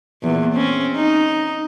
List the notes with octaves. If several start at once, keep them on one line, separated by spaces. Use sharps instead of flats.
E2 A#2
C4 C#4
D#4